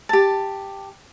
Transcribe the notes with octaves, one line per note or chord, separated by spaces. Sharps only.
G4 A5